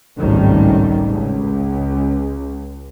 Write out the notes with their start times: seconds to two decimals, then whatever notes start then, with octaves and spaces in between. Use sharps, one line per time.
0.19 G#1 C#2 A2 D#3 G3
1.10 C#2